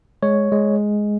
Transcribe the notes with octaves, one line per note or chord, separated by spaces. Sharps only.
G#3 C#5
G#3